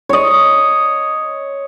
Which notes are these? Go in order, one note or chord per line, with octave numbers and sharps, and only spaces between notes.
C#5 D#5